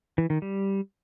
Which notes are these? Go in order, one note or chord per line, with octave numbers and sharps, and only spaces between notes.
E3
D#3
G3